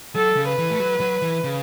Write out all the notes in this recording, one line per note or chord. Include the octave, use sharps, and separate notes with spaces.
F#3 A4
C#3
B4
E3
A3
F#3
F#3
E3
C#3